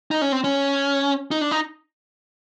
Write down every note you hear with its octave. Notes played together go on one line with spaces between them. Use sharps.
D#4
C#4
C4
C#4
D#4
D4
D#4